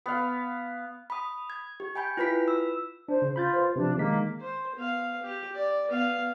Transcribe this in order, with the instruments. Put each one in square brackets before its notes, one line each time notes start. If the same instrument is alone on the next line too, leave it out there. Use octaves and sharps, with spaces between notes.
[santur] B3 F5
[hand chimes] B5 D#6
G#6
G4
G5 G#5 B5 G6
E4 F4 B4 B5 B6
E6
[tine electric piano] D4 [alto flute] C5
[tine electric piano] C#3
[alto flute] F4 [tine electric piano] B5 G6 A6
[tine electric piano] B4 C5
[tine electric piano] C3 F3 [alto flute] D4
[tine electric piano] D#3 G#3 B6 [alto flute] A#3
[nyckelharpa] C5
B3 F5
G4
D5
B3 F5